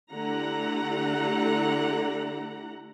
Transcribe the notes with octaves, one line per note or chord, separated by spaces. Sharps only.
D3 A3 E4 G4 F#5 A#5